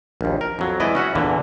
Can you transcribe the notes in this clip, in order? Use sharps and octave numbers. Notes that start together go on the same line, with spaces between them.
A#1 D#2
A#4
F2 F#3
E3 G#3 E4 D5 D#5
C#4 F#4 E5 F#5
E2 A#2 D3 E3